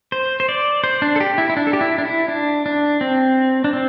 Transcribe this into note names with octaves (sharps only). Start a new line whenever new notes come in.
C5
C5
D5
C5
D4
A4
G4
E4
E4
D4
A4
G4
E4
D4
E4
D4
D4
C4
D4
C4